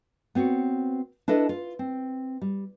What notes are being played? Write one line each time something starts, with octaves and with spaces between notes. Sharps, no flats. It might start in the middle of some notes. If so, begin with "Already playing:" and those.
B3 C4 F#4 C#5
D4 E4 A4 B4 D#5
F4
C4
G3